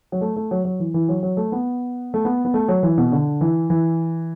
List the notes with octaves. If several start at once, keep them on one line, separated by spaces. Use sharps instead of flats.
F#3
A3
A3
F#3
F#3
E3
E3
F#3
F#3
A3
B3
A3
B3
B3
A3
F#3
E3
B2
D3
E3
E3